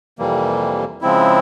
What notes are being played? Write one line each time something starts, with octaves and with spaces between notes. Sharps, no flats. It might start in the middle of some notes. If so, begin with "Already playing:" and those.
F2 C3 E3 G3 A#3
C#3 F3 G#3 C4 E4